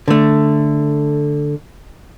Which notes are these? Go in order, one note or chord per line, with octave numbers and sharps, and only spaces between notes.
D3 A3